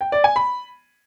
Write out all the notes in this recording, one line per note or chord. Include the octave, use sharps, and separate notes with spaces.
G5
D5
G#5
B5